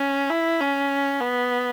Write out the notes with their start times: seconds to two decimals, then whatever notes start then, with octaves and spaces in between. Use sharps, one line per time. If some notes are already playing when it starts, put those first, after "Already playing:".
Already playing: C#4
0.30 E4
0.60 C#4
1.20 B3